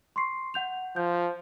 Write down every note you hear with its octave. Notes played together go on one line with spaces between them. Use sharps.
C6 C#6 C7
F#5 G6 F7
F3 G6